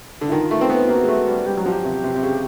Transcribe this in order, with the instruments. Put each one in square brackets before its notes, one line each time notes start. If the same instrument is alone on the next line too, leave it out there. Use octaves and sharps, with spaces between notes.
[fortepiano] D3
[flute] E4
[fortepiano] D#3 [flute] F4
[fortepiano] A3
C4
B3
[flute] F4
[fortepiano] A#3 [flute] F#4
[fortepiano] G#3
A3
G3
[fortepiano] G3 [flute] G4
[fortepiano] F#3 [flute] F#4
[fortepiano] F3
[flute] G4
[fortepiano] C3
C3
C3
C#3